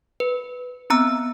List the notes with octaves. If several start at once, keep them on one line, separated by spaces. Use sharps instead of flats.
B4
B3 C4 A#5 E6